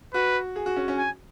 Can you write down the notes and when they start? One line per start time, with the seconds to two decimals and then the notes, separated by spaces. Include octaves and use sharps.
0.14 F#4 B4
0.56 G#4
0.66 F#4
0.76 C#4
0.88 C#4
0.98 G#5